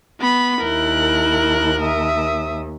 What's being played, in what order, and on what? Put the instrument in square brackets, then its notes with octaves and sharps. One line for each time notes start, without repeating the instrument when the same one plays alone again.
[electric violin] B3 B5
[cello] D#2 [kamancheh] E4 F#6 [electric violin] A#4
[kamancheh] E5 D#6